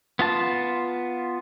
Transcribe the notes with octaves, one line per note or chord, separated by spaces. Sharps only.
B3 F4 A5